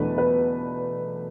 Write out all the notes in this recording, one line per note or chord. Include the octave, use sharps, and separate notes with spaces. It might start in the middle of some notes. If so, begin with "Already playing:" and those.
Already playing: E2 B2 A3 D4 B4
B4